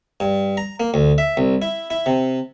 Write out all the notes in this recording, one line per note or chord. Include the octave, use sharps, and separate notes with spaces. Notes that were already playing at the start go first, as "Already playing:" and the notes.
G2
A#5
A#3
D2
E5
C2
E4
E4
C3